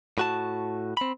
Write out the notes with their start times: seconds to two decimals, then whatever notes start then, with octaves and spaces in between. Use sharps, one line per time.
0.18 A2 F#4 A5
0.97 C4 B5